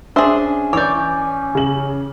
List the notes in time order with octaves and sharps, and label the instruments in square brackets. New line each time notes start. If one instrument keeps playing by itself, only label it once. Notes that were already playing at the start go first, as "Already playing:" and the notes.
[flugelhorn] C#4 [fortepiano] D4 E5 [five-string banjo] G#4 C5
[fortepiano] E3 [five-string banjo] C#5 D5 [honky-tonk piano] D6 G6
[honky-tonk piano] C#3 F#7